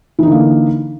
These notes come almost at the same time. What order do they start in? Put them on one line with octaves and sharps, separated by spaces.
E3 D#4 D3 A#3